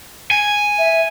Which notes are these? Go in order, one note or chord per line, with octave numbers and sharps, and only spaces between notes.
G#5
E5